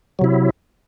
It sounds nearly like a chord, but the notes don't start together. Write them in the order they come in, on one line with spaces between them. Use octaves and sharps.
F#3 C3 E4